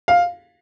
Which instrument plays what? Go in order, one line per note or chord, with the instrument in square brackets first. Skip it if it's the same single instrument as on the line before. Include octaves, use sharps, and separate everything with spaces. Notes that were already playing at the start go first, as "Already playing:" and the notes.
[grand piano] F5